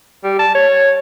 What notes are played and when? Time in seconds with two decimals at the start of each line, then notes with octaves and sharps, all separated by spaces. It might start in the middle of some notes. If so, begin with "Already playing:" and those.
0.24 G3
0.39 A5
0.55 C#5